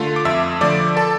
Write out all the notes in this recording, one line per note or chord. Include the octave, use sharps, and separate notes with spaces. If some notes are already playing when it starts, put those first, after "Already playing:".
Already playing: D3 A3 F4 F5
D6
F2 E5 E6
D3 F3 A3 D5 D6
A4 A5